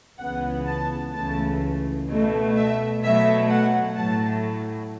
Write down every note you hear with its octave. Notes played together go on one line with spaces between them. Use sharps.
C#2 C#3 E3 B3 F#5
A5
C#2 C#3 E3 A3 A5
B2 A3
E5
B2 F#3 A3 E5
F#5
A2 F#3 A3 A5